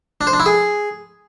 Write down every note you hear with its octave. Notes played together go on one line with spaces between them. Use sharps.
D4
C5
D4
E4
G#4